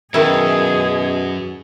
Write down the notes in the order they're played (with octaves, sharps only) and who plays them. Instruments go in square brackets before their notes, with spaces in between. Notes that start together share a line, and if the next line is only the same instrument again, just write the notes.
[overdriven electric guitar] F#2 [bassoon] B2 [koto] D#3 E4 [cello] G#4